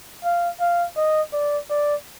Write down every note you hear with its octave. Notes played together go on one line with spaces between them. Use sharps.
F5
F5
D#5
D5
D5